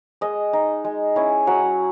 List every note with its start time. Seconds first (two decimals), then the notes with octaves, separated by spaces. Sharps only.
0.21 G#3 D#5
0.53 D#4
0.84 G#3
1.16 C#4 E4
1.47 F#3 F#5